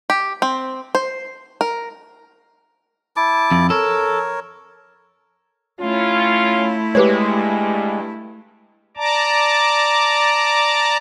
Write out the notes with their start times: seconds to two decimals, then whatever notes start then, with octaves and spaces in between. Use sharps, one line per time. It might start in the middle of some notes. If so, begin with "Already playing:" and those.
0.10 G4
0.42 C4
0.95 C5
1.61 A#4
3.16 E4 A5 D6
3.51 F2
3.70 A4 A#4 C#5
5.80 A3 C#4 E4 F4
6.95 G2 G#3 G4 B4 C#5
8.97 D5 A5 A#5 D6